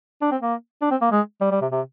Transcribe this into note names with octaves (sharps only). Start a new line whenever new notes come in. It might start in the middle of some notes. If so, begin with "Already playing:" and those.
D4
C4
A#3
D4
C4
A#3
G#3
G3
G3
C3
C3